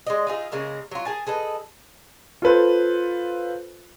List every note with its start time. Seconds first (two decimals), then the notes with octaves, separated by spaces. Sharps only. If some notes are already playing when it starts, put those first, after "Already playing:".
0.07 G#3 D5 D#5
0.27 D#4 F4 G#4 E5
0.52 C#3 G#3 A#3 A#4
0.91 F#3 F4
1.05 G#4 A#4 G#5 A5
1.27 G#4 A4 B4 D#5
2.42 F4 A4 B4 C5